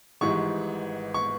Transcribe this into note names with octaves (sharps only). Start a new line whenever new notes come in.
G#1 G#2 E3 G3 C#6
C#6